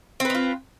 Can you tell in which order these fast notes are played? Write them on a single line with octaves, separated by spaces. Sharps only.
C4 B4 D#4 F4